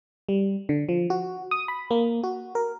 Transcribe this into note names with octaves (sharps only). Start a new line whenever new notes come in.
G3
D3
F3
F#4
D#6
B5
A#3
F#4
A#4